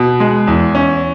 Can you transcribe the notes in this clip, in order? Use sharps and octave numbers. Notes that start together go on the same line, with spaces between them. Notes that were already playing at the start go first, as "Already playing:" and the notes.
Already playing: B2
G#3
E2
C#4